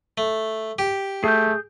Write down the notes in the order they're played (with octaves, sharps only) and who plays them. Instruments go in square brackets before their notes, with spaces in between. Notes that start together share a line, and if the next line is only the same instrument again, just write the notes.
[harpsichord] A3
G4
[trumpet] A3 [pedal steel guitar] G#4 G6